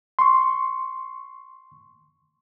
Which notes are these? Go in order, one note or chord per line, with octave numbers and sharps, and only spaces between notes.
C6 C#6